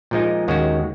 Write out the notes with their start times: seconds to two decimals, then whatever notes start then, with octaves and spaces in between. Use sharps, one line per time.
0.11 A#2 F3 G#3 D#4
0.48 D#2 D#3 G#3 C#4 F#4